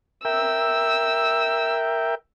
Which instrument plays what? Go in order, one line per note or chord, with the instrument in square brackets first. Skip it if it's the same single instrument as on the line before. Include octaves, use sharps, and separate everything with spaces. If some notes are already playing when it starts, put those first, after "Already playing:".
[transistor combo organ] A#4 E5 G5 [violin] E6